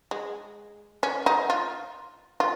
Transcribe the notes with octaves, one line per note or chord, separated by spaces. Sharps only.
G#3
C#4
D#4
F4
F4